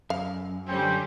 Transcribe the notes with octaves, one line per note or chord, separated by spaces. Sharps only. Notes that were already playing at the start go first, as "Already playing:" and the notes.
F#2 F5
D3 G3 C4 C#4 G5